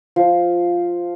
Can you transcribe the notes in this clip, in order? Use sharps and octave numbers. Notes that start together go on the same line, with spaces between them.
F3